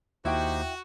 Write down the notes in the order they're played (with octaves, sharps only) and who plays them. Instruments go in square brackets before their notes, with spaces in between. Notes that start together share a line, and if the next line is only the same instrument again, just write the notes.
[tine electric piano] D#2 [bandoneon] D#4 G4 C5 [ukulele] E4 G5 [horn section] F#4